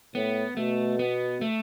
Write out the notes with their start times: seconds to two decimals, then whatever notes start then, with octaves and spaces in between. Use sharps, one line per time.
0.15 A2 B3
0.57 B2 A3
0.99 B3
1.41 A3